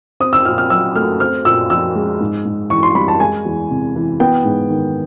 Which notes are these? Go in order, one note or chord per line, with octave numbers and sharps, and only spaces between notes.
C4 D#6
E6
A#2 F6
F6
F#3 E6
A3 F6
C4 F6
A#2 E6
F3 E6
G#3
G#2
G#2
E3 C#6
C6
G3 B5
A5
G#3 G#5
E2
C3
E3
B3 G5
G#2
D#3